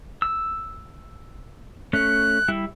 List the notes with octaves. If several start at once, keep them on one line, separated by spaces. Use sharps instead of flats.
E6
A3 C#4 F#6
G3 E4